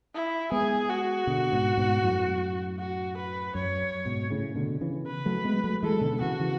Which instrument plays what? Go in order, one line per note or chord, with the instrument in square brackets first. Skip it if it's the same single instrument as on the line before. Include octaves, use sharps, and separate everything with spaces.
[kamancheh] E4
[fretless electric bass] G#3 B3 [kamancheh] G#4
[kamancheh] F#4
[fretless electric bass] B2 D3
G#2 B2
G#2 B2
F#2 A2
[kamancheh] F#4
B4
[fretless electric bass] F#2 [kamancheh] C#5
[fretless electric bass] G#2 B2
A2 C#3
B2 D3
C#3 E3
[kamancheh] B4
[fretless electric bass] F#3 A3
G#3 B3
F#3 A3
[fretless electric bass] E3 G#3 [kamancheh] A4
[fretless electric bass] B2 D3
D3
[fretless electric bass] C#3 E3 [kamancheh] F#4
[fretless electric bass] C#3 E3